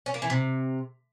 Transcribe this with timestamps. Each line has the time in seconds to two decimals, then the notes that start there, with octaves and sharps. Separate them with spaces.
0.06 C#4
0.14 A#3
0.22 E3
0.30 C3